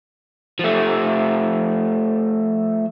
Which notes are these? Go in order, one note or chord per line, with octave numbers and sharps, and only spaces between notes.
F3 A3